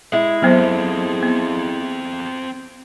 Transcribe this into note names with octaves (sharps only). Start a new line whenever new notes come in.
G#3 E4
F#3 B3 C4 A4 C5
B3